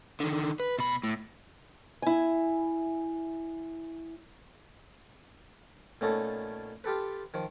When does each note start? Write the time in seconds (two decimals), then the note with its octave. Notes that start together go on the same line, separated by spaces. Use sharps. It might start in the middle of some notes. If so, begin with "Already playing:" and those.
0.20 D3 D#3
0.60 B4
0.78 B2 B5
1.04 A2
2.02 E4 G#5
6.01 A#2 A3 B3 C#4 D#4 A4
6.84 F4 G4 A4 B4
7.34 D#3 F3